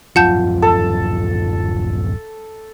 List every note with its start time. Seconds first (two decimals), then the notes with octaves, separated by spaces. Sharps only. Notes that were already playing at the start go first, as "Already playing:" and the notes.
0.16 D1 F#2 F3 F4 F#5 A5 G6
0.62 A4